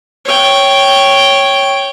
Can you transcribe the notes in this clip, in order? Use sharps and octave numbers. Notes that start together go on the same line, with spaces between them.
C#5 G5